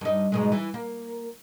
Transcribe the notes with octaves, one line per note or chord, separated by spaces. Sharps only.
G2 D#4
G#2 B2 G#3
E3
A#3